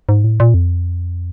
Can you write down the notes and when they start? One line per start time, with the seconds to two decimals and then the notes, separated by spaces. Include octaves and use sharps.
0.09 G#2
0.24 A2
0.40 A#2
0.54 F2